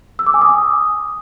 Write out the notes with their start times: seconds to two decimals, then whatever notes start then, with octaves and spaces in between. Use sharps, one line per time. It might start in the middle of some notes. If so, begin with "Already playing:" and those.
0.19 E6
0.27 D6
0.34 G#5
0.41 D#6